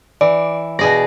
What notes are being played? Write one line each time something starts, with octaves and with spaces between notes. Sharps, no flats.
E3 D5
B2 G#4 D5 A#6